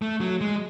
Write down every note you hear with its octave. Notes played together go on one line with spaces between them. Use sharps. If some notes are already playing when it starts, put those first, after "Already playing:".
A3
F#3
G#3